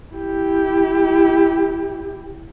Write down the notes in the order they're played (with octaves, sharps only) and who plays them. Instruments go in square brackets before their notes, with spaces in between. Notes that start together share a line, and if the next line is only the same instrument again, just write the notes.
[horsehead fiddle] E4 G4